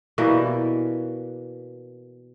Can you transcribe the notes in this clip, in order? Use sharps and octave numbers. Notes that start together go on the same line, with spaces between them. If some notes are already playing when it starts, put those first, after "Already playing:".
B2 E3 G3 A#3